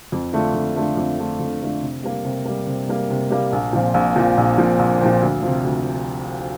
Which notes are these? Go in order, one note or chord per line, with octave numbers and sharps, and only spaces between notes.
F2
D3 A3 D4 F4
F2
D3 A3 D4 F4
F2
D3 A3 D4 F4
F2
D3 A3 D4 F4
C3
G3 A#3
C3
G3 A#3
C3
G3 A#3
C3
G3 A#3
A#1
A#2 F3 C4
A#1
A#2 F3 C4
A#1
A#2 F3 C4
A#1
A#2 F3 C4
D2
C3 F3
D2